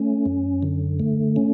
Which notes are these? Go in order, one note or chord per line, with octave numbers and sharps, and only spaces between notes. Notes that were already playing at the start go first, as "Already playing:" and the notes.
Already playing: A3 C#4
F#2
D3
A3
C#4